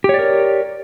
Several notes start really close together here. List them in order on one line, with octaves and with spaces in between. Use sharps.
G4 C#5 D5 A#4